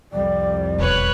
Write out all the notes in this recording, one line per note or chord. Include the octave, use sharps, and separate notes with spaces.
C2 F2 G3 D5
E1 B4 C#5 F#6